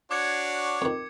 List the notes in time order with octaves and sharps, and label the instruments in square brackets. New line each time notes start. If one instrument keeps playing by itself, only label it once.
[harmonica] D4 F#4 C#5 [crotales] D6 G#6 C#7
[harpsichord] F2 D#3